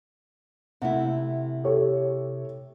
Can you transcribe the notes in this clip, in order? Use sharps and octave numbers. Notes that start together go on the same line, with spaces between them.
C3 A3 E4 F#5
G4 A4 C#5